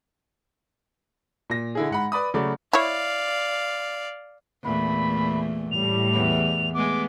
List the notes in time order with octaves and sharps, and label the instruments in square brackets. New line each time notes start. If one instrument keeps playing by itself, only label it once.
[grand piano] A#2 A#6
D3 E4 G#4
G#2 F#5 B5
B4 D5 B5 D#6
C#3 F#3 A3 D5 B5
[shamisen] E4 C#5 [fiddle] D5 F5
[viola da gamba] E2 A#2 A3 [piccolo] B5
[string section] A2 G3 [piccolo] F7
[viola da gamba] E2 A3
[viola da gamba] G#3 A3 B3 [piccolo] D6